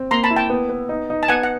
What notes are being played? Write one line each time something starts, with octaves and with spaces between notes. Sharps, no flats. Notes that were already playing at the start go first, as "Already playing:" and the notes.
Already playing: C4
A#3 A#5 C6
A5 B5
E4
G5 A5
B3
B3
D#4
D#4
A5
B3 F#5 G#5
F#5